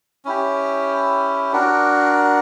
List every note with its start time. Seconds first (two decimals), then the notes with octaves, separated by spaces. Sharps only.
0.25 C#4 E4 G4
1.52 D4 F#4 A#4